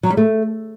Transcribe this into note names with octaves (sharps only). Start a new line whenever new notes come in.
F#3
G3
A3